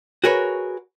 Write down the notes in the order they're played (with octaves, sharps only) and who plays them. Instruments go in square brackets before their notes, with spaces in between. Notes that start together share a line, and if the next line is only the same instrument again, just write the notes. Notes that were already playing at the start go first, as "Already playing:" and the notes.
[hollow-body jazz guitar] F#4 G#4 A#4 B4 C#5